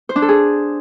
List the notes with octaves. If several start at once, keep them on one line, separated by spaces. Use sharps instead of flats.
C5
D4
A4
G#4